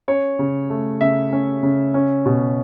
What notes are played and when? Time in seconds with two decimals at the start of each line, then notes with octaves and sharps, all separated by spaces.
0.08 C#4 C#5
0.39 C#3
0.70 A3
1.01 C#3 E5
1.33 C#4
1.63 C#3
1.94 C#4
2.26 B2